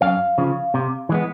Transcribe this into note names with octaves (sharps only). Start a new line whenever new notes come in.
F#2 F5
C#3 F3
C3
E3 G#3 B3